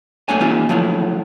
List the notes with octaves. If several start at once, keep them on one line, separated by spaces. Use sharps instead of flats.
F#2 A3 A#3 D4 C#5 G#5
E3 A#3 C4 D#4 F4 G4
F3 F#3 A3 E4 F4